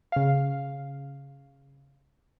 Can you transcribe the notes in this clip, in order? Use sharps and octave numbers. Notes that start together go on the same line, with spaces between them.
C#3 F5